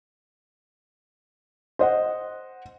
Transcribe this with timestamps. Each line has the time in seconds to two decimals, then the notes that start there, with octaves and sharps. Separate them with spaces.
1.79 C5 D#5 F#5